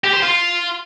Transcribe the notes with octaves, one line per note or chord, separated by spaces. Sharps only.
G4
C5
F4